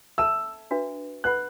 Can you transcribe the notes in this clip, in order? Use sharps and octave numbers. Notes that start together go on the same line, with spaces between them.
A4 E5 A5 E6
D4 F#4 B4 E5
B4 F#5 B5 F#6